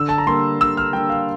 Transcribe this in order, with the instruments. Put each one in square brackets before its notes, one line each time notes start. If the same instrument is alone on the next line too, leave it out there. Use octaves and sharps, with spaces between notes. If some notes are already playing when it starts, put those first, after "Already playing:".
Already playing: [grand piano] D3 E6
A5
A#5
G3 A#3 D4 C6
D3 E6
F6
G3 A#3 D4 G5
F5